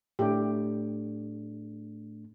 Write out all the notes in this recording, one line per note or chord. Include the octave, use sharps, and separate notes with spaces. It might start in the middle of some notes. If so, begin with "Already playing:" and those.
A2 A3 D4 G4